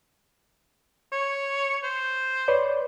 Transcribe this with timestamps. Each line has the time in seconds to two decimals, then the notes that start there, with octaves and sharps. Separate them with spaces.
1.12 C#5
1.83 C5
2.48 B4 C#5 D5